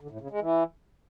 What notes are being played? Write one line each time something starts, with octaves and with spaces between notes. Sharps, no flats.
D3
A2
C#3
G#3
E3